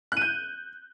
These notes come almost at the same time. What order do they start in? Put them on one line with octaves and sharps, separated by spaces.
F#6 D#7 G6